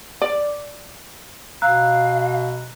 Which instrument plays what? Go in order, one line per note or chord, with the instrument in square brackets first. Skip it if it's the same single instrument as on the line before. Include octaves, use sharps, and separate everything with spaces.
[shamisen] D5
[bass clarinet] B2 [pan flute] F5 [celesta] A#5 E6 F#6